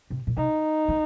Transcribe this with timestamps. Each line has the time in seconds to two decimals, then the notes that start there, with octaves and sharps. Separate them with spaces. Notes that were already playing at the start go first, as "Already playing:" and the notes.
0.10 C3
0.27 A#2
0.37 C3 D#4
0.88 D#3